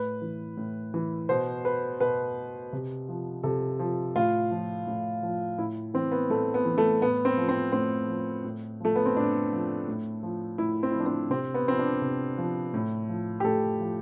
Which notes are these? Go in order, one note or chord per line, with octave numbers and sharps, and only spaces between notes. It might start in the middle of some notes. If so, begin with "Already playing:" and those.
Already playing: A2 B4
E3
A2
E3
B2 C5
B4
B2 B4
C3
F3
C3 A4
F3
A2 F4
F3
A2
F3
A2 E4
E3 C4
B3
A2 A3
B3
E3
A3
A2 B3
C4
F3
C4
A2 C4
F3
A2
F3 A3
B3
C4
A2 D4
F3
A2
F3
A2 E4
C4
E4
F3 D4
C4
C3 C4
B3
F3 C4
D4
C3
F3
A2
F3
G4
A2 A4
F3